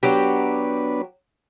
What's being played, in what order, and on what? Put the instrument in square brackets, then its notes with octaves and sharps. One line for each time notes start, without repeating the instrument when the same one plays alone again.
[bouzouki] F#3 G4 [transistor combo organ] B3 D4 B4